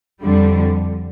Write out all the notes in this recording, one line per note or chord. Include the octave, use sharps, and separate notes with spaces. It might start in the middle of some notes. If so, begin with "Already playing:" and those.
F2 D3 G3